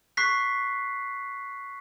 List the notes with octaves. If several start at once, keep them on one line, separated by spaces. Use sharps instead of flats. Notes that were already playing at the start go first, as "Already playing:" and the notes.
C#6 F#6 B6 C7